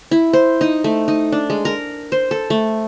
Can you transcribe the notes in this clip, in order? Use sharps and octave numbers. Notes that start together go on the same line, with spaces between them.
E4
C5
D#4
A3
D#4
D4
G#3
A#4
C5
A4
A3